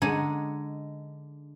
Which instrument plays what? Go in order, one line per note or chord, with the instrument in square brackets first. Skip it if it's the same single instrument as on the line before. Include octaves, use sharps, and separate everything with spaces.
[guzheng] D3 G#3 D#4 C#5